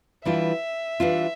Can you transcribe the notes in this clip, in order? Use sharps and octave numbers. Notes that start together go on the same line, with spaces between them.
E3 G3 D4 F4 E5
E3 G3 D4 F4